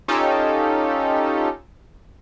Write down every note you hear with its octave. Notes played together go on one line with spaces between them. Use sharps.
C#4 D#4 F4 G4 A4